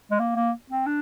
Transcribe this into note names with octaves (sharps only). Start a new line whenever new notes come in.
G#3
A#3
A#3
C4
D4